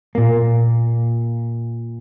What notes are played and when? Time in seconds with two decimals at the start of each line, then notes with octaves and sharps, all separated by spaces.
0.15 A#2 A#3